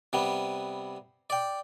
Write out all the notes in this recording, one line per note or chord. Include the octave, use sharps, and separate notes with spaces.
C3 G3 B3
D5 G5